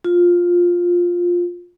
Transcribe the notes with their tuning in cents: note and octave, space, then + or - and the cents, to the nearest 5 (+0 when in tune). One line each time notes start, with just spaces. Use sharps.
F4 +10